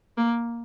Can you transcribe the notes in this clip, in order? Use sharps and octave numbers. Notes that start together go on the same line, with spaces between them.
A#3